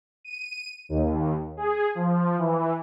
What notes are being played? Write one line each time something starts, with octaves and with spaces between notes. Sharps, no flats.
D#7
D#2
G#4
F3
E3